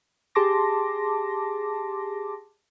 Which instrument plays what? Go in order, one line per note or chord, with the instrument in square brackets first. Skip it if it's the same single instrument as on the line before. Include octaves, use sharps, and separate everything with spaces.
[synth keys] G4 G#4 A5 C6 D6 A#6